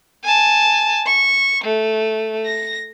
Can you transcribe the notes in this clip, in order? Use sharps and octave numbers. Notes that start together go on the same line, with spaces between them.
G#5 A5
C#6
A3
A#6